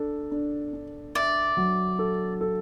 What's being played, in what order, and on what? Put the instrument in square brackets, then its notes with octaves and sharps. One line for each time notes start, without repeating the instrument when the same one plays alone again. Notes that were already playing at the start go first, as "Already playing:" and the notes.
Already playing: [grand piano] D4 A4
D4
D4
[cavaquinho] D5 [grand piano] E5
[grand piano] F#3
A4
A4